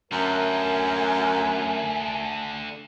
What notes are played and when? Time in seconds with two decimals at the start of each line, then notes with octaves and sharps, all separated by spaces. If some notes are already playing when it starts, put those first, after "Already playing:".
0.12 F#2 D3 A3 A#4 G#5